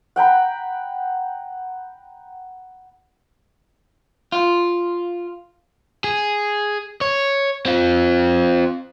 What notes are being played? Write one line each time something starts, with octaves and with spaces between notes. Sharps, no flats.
F#5 G5 A#5 B5
F4
G#4
C#5
C4 F4